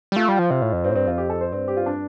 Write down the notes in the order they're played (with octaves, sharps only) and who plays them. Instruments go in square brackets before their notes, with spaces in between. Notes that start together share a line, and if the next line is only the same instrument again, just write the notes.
[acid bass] G3
[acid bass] A3 [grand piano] F4
[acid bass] G3
F3
C3
A2
F2
[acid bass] G2 [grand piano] C4
[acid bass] A2
[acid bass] G2 [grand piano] C4
[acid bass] F2 [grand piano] F4
[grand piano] G4
A4
C5
[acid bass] G2 [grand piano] C4
[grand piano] G4
F4
D4